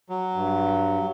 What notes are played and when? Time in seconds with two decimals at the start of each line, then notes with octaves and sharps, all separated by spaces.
0.09 F#3
0.33 G2